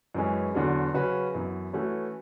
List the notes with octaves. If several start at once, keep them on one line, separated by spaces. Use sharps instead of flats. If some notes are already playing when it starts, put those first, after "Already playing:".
F#2 E3 G#3 C#4 G#4
E2 D3 F#3 C#4
C#3 F#3 C#4 F#4 B4
F#2 E3 B3
E3 A3 C#4 F#4 A4